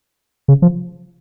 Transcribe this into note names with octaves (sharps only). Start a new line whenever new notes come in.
C#3
F3